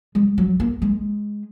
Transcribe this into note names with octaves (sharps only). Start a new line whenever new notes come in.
G#3
F#3
A#3
G#3